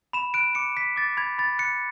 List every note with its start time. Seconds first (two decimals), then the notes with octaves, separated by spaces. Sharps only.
0.13 B5 E7
0.34 F#6 D7
0.55 D6 C#7
0.77 B5 B6
0.96 D6 A6
1.17 B5 G#6
1.38 B5 A6
1.59 F#6 C#7